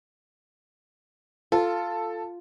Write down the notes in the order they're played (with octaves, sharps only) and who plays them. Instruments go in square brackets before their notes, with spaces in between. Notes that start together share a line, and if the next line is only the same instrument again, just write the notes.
[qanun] F4 [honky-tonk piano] A4